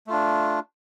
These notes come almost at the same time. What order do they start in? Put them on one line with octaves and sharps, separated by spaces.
A3 F4 D4